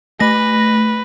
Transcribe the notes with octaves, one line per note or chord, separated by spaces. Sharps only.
A3 B4 A#6